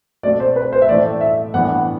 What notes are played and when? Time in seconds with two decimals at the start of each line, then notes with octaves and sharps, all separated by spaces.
0.23 B2 A3 C4 D5
0.40 C5
0.56 B4
0.73 C5
0.82 E5
0.89 A2 E3 A3 D5
1.21 E5
1.54 A2 E3 B3 D4 F#5